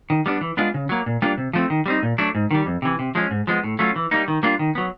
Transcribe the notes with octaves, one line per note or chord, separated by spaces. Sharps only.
D#3
G3 B3 D4
E3
G#3 B3 D4 F4
C#3
F#3 A#3
A#2
G3 A#3 D4 F4
C3
F3 A3 C4
D#3
G3 C4 D#4
A#2
F#3 A3 D4
G#2
D#3 G3
F2
C3 E3
C3
F3 G#3 C#4
G#2
F3 G#3 B3
A2
F#3 A3 C#4 F4
E3
G3 A#3 D#4
D#3
G3 A#3 D4 F4
D#3
F#3 B3